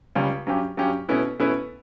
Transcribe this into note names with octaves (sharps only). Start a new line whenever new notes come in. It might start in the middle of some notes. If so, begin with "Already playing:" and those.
C#2 C#3 G3 C#4
G2 F#3 C#4 G4
G2 F#3 C#4 G4
B2 A3 C#4 E4 B4
B2 A3 C#4 E4 B4